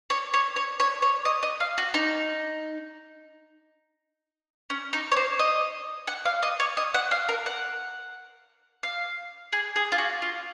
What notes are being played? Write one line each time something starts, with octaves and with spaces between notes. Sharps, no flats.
C#5
C#5
C#5
C#5
C#5
D#5
D#5
F5
F#4
D#4
C#4
D#4
C#5
C5
D#5
F#5
F5
D#5
C#5
D#5
F#5
F5
A#4
F#5
F5
G#4
G#4
F4
F#4
F4